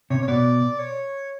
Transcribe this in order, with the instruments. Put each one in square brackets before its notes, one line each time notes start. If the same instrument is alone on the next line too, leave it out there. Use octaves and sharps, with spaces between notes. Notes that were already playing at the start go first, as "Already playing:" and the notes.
[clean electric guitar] C3 [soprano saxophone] C#5
[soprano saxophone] C#5
[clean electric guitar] B2 [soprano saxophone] D5
[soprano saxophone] C#5